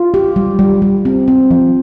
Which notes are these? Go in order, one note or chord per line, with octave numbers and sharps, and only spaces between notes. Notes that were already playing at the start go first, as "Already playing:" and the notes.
Already playing: F4
G4
G3
G3
G3
C4
C4
F3